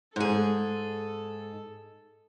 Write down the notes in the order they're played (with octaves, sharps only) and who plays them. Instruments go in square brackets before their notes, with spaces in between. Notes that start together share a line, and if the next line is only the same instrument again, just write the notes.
[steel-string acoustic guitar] G#2 G#4 [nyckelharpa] A4